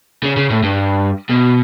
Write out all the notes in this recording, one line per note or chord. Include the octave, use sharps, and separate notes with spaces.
C#3
C#3
A2
G2
B2